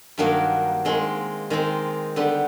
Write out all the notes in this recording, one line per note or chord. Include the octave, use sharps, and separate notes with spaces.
G2 D#3 F#3 A#3
D#3 G#3 C4 D#4
D#3 G#3 C4 D#4
D3 G3 B3 D#4